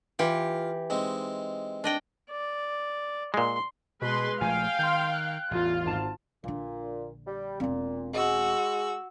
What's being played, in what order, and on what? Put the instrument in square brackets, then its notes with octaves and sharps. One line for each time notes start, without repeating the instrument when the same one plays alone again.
[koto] E3 G4 [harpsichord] F4
[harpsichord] G#3 C4 D#4
[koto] D4 D#5 G5
[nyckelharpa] D5
[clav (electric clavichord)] A#2 G#3 [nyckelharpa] C6
[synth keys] B2 [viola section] G#3 B4 C6
[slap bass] A#1 F3 A3 [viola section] F5 G5 [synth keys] G#5
[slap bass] D#3 [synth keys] C6 G6
[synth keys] F#6
[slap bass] A1 E2 [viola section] F4
[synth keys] G#1 G#2 A5
[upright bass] A#1 D3 [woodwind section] A#2
[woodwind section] G3
[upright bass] E1 C4 [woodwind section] A#2
[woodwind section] G#3 [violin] F#4 E6